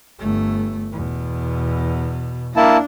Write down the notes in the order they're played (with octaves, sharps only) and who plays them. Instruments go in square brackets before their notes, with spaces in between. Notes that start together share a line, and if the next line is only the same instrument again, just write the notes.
[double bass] G1 A3
E2 B2
[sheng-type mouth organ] A#3 E4 A5 [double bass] D4